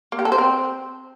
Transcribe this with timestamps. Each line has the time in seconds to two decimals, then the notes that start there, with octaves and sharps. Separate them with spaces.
0.12 A#3
0.19 G4
0.25 A4
0.32 C5
0.38 C4